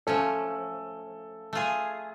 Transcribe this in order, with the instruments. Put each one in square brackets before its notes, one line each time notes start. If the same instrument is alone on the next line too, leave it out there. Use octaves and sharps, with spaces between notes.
[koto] F3 A3 C#4 [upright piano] A4
[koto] A3 F4 G#4